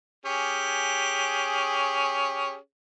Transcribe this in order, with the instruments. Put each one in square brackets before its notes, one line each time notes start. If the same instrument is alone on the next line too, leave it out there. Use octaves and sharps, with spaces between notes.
[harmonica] C#4 G4 G#4